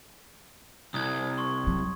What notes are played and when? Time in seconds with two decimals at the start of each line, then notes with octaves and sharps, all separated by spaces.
0.94 C2 D#6 G#6
1.37 C6 C#6
1.67 F#3